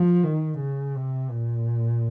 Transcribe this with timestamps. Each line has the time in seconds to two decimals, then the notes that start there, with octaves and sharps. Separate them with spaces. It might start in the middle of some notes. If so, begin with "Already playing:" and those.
Already playing: F3
0.24 D#3
0.59 C#3
0.95 C3
1.30 A#2